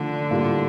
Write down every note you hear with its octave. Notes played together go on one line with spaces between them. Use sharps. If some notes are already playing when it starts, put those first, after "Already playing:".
Already playing: D3 F3 A3 D4
A2 G3 A#3 F4